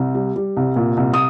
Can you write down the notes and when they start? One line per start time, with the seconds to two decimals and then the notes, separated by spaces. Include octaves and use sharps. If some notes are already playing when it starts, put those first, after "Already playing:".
Already playing: C2
0.15 G3
0.36 G3
0.57 C2
0.76 A#2
0.97 C2
1.14 D#6